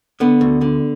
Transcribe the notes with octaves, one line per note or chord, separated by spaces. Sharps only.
D3 B3
D2
D3